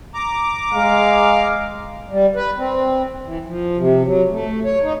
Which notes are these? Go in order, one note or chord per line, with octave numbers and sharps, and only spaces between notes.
A#5 D6
G#3 F5
G3
B4
C4
E3
F3
C3
F#3
A3
C#5
D#4